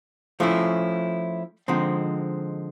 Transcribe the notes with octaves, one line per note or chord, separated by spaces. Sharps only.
F3 A3 C#4 E4
D3 F3 G#3 C4 D#4